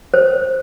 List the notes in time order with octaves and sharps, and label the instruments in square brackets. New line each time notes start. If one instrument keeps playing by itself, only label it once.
[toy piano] C5